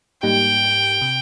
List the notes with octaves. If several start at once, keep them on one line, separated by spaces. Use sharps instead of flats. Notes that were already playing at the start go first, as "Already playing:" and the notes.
G#2 G3 A#3 D#4 G4 G5
C3